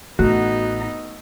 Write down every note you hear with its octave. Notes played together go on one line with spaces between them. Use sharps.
A1 A3 B3 D#4 F#4